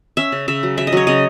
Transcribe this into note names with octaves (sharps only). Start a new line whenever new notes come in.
C#4 E5
C#3
C#3 E5
F#3
F#3 E5
D#5
F#3 C#5
C#3 D#5